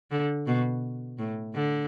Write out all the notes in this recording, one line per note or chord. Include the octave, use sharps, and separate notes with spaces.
D3
B2
A2
D3